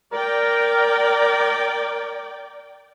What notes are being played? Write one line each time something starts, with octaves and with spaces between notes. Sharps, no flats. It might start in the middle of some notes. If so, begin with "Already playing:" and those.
A#4 D5 G5